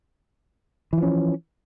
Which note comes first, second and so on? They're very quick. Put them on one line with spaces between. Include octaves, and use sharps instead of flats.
E3 F3 C#4